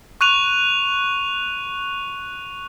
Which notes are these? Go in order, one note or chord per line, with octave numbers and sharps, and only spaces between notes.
C#6 F#6 D#7 F7